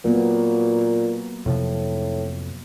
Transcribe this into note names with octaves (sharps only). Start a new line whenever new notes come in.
A#2 F#3 A#3 B3
F2 A2 C3 F3